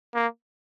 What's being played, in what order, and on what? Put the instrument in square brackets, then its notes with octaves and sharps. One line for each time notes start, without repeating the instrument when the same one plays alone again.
[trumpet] A#3